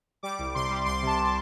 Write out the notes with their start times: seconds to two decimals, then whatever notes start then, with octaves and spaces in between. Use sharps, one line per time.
0.23 G3 D6
0.39 C2
0.55 C3 C6
0.70 G3
0.86 C2 C6
1.02 C3 A5
1.18 C3